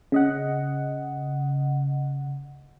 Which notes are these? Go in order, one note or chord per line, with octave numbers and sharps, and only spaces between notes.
C#3 D#5 F#5